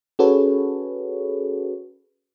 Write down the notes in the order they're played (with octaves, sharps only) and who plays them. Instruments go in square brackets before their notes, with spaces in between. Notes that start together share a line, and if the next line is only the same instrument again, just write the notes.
[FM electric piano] C#4 F#4 G#4 A4 B4 C#5